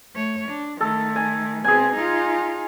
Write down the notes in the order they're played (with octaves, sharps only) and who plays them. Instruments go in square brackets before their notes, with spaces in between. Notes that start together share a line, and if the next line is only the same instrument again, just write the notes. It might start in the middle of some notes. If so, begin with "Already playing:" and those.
[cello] A3 C#5
D4
[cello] D#3 A3 [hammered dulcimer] A4
[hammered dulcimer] G#5
[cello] B2 C4 [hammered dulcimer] G#4 G#5
[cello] D#4 F4